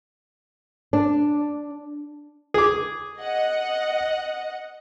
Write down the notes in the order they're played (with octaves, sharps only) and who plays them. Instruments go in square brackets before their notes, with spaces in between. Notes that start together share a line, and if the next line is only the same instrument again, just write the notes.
[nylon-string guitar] D4
[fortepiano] G#4 D6
[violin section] D#5 F#5